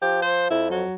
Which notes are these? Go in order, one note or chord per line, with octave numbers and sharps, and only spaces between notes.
F3 G4
C5
F2 E4
F#3